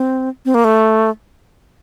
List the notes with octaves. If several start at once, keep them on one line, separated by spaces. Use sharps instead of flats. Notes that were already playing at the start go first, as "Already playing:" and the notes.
Already playing: C4
C4
A#3
A3